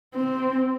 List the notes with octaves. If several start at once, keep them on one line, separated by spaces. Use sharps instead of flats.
C4